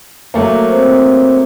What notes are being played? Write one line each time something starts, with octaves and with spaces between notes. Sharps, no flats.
F#3 A3 A#3
C4 C5